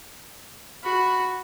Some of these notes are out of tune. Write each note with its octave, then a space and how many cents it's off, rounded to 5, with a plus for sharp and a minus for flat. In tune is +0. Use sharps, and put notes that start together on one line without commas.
F#4 +0 B5 +0